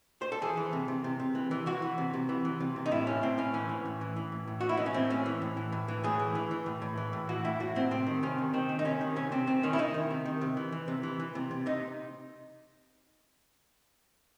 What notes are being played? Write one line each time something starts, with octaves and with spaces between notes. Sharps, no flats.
C5
A4
E3 G#4
E3
C3
C3
C3
C3
E3
E3
E3 F#4
E3
C3
C3
E3
E3
C3
C3
D#4
A2 E4
A2 C#4
A2 C4
A2 C#4
E3 C#4
E3
A2
E3
E3
A2
A2
A2 F#4
E4
E3 D#4
C#4
A2 C4
A2 C#4
E3
A2
E3
A2
E3
A2 G#4
E3
E3
E3
A2
A2
E3
A2
E3 F#4
A2 E4
A2 F#4
A2 C4
C3 C4
D#3
C3 C#4
D#3
D#3 C4
D#3
D#4
C3 C#4
D#3
C3 C#4
C3 C4
C3 C4
D#3 C#4
E4
D#3 D#4
D#3
C3
D#3
C3
E3
E3
C3
E3
E3
C3
C3
C3 D#4